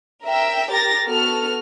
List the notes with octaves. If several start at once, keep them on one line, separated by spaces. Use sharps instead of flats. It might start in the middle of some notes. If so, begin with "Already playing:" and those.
A#4 E5 G5
G4 A#4 A6 A#6
B3 F#4 A4 F6